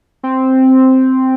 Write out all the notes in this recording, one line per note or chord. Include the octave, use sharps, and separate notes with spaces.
C4